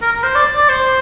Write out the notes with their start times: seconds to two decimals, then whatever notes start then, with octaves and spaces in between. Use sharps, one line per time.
0.01 A#4
0.12 A#4
0.23 C5
0.35 D5
0.56 D5
0.69 C5